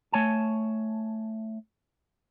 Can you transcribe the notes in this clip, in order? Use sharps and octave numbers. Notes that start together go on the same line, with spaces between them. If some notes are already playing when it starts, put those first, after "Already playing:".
A3 C#5 G#5 A5